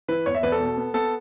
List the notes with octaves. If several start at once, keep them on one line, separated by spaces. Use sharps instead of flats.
E3 B4
E2 C#5
E5
E2 B4
A4
B2
B3
B3 A4